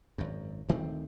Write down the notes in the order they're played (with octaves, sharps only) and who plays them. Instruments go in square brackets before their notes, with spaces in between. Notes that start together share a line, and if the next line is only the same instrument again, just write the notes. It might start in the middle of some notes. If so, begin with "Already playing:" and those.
[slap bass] G#1 F#2
D2 D#3 A3 C4